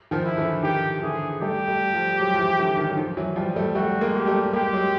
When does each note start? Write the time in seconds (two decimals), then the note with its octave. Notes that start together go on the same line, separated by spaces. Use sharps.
0.11 D#3 F3
0.25 E4
0.38 D3 E3
0.63 D#3 G4
1.03 D3 E3 G#4
1.41 G3 A3 G4
1.68 G3 A3
1.93 F3 G3
2.20 F#3 G#3
2.34 F3
2.39 E3 F#3
2.59 D3 E3
2.77 D#3
2.88 F#3
2.97 D#3 F3
3.17 E3 F#3
3.36 F3 G3
3.56 G3 A3
3.75 G3 A3 F#4
4.01 G#3 A#3
4.14 G4
4.27 G3 A3
4.53 G#3 A#3 G4
4.73 F#3 G#3